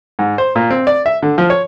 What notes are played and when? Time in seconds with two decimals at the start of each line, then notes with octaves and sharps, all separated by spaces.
0.19 G#2
0.38 C5
0.55 A#2
0.71 C4
0.87 D5
1.06 E5
1.23 D3
1.38 F3
1.50 C#5